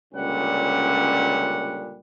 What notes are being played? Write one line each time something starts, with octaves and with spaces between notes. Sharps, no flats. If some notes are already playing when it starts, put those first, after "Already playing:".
C#2 A#2 D3 G3 C#4 F#5